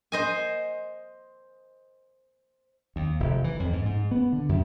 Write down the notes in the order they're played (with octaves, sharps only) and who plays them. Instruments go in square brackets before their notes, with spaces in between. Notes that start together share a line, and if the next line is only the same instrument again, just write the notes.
[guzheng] C5 D#5 G#5
[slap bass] D#2
F1
E3
F2
G#2
G#2
B3
D3
F#2